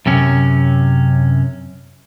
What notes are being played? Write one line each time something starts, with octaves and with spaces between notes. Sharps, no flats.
F#2 C3 C#4